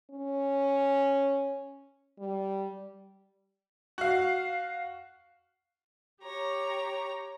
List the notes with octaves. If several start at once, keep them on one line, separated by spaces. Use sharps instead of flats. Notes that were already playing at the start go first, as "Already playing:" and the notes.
C#4
G3
F#4 F5
G4 C#5 A#5